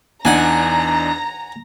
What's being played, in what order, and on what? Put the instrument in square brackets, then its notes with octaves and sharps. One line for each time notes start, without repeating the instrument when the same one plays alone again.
[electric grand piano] E2 D4 D#4 [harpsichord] F#5 G#5 [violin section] A#5